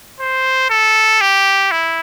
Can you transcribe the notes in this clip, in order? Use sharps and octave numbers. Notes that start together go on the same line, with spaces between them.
C5
A4
G4
E4